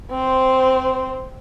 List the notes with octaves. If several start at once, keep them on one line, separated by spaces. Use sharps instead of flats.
C4 C5